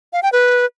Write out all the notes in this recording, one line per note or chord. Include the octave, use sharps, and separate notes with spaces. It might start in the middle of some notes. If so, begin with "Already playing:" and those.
F5
G5
B4